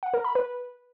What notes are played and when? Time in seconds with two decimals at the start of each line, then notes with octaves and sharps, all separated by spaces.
0.03 F#5
0.14 A#4
0.24 B5
0.35 B4